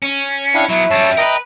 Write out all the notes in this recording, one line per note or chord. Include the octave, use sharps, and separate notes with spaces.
C#4
D4 E4 F5 G5
F#3 B3 E4 E5
F#2 G3 C#5 A5 E6
A#4 B4 D#5 G5 A#5